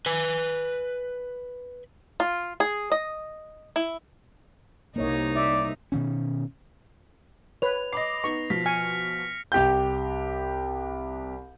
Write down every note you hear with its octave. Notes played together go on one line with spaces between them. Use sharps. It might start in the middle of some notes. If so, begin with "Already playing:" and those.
B4 G#5
F4
G#4
D#5
E4
C2 C3 A#3 D#4 C#5 D#5
D5 E5
B2 D#3 C#4
B4 C#5 F7
D#5 B5 D6 A#6 C7
B3 D#4 C#6
B2 F3 B6
G#5 F6 C#7
C2 G4 G5 G6